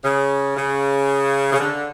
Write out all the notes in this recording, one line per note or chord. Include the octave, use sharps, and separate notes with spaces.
C#3
C#3
C#3
D3